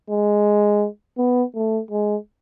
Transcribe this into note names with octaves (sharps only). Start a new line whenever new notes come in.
G#3
B3
A3
G#3